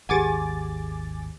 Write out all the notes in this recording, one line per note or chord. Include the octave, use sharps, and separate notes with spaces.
G#1 D#2 G4 G#4 F#5 G#5 D6 A6